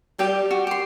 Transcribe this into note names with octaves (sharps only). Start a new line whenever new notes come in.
G3 G4 G5
F#4
G4 C6